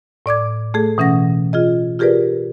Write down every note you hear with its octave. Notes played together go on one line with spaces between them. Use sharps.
A2 D5 D6 G#6
A3 G#4 A4
B2 E3 C#4 F#5 A#6
F4 G#4 D#5
F4 G4 G#4 A#4 B4 D5